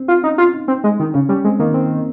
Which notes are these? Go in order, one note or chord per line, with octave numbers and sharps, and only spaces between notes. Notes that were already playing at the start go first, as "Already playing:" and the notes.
Already playing: C4
F4
C#4 D#4
F4
D#4
C4
G#3
D#3
C#3 C#4
G3 C#4
G#3 C4
D#3 A#3
C4